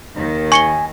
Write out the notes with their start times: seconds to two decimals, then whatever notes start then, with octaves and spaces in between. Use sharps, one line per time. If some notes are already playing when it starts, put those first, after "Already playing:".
0.17 D#2 D#3
0.52 G#5 C#6 C#7 G7